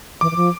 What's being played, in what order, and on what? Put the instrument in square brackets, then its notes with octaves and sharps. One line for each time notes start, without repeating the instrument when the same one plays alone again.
[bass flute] E3 [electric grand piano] D6
[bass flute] E3
F3